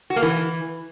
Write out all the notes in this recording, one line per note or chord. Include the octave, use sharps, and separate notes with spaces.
F#4
A#3
E3